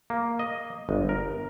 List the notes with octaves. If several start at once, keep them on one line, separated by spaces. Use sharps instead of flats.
A#3
D#5
G1
A#4